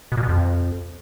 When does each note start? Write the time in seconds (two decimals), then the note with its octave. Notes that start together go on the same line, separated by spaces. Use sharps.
0.12 B2
0.17 A#2
0.23 B2
0.29 F2